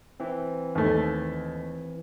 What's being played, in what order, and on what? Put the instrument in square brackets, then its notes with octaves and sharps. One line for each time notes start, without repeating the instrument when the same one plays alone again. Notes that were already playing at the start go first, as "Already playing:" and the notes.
[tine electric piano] E3 C4
[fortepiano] D#2 A3